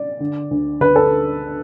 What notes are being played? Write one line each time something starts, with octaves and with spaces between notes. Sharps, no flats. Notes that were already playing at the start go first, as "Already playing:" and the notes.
Already playing: D5
D3
D2
D2 B4
A4